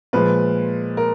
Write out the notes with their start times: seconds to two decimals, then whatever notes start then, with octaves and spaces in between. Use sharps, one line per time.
0.13 A#2 F3 G#3 B4
0.97 A#4